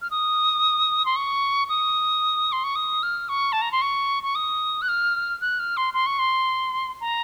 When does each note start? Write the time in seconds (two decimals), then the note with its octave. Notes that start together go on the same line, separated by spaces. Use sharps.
0.02 F6
0.11 D#6
1.06 C6
1.16 C#6
1.69 D#6
2.52 C6
2.64 C#6
2.76 D#6
3.03 F6
3.29 C#6
3.52 A5
3.62 A#5
3.72 C6
3.82 C#6
4.23 C#6
4.35 D#6
4.82 F#6
4.88 F6
5.41 F#6
5.59 F6
5.77 C6
5.94 C6
6.06 C#6
6.19 C6
7.01 A#5